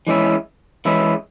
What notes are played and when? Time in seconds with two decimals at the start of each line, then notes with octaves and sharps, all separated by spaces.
0.07 E3 G#3 C#4 E4
0.85 E3 G#3 C#4 E4